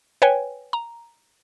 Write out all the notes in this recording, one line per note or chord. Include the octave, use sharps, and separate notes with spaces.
B4 C#5 G5 G#5
A#5